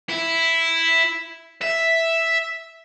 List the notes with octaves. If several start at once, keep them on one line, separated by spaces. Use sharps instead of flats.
E4
E5